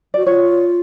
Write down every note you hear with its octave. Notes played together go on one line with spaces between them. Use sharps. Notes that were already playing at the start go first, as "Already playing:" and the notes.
F#4 D5
F4 C#5